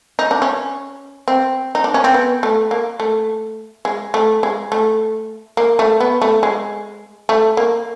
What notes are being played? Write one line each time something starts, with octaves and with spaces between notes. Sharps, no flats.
D#4
D4
C#4
C4
D#4
D4
C#4
C4
B3
A3
A#3
A3
G#3
A3
G#3
A3
A#3
A3
B3
A3
G#3
A3
A#3